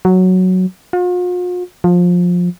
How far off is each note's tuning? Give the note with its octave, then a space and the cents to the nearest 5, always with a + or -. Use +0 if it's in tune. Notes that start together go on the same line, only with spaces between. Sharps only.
F#3 +0
F4 +45
F3 +20